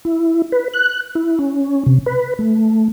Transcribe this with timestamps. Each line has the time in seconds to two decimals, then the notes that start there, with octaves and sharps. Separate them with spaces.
0.05 E4
0.52 B4
0.74 F#6
1.15 E4
1.39 C#4
1.86 C3
2.06 B4
2.39 A3